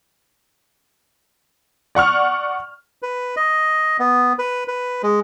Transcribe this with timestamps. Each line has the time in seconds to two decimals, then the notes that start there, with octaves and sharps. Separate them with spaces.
1.95 D5 F#5 C#6 F6
3.02 B4
3.36 D#5
3.99 B3
4.39 B4
4.68 B4
5.03 G#3